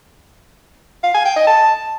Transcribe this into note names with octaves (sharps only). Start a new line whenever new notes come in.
F5
G#5
G5
D#5
A5